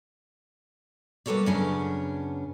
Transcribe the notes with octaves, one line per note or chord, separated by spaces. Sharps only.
G3 A#3 B3 A4 C#5 D5
F#2 C#3 B3 C#4 D4